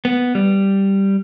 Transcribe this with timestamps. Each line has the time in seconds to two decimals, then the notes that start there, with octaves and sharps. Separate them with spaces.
0.05 B3
0.35 G3